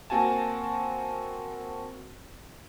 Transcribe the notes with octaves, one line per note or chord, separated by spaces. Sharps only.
A#3 C4 F#4 G#5 A5